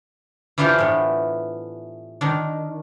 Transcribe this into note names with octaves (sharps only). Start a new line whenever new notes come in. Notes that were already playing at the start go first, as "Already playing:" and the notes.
E3 D4 F4 G4 C5 F5
A2 B3
D#3 D4